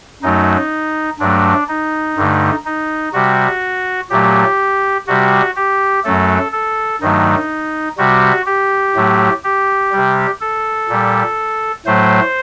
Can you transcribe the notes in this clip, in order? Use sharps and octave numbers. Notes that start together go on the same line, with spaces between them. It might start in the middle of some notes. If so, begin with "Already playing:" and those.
F#2 F#3 A3 D#4
G2 F#3 A3 D4
D#4
G2 D3 A3
D#4
C3 G3 F#4
A#2 F#3 A3 G4
C3 G3 F#4
G4
F#2 F#3 A3 A4
A4
G2 D#3 F#3 A3 D#4
C3 G3 F#4
G4
A2 F#3 A3
G4
C3 G3
A4
A#2 G3
A2 F#3 A3 C5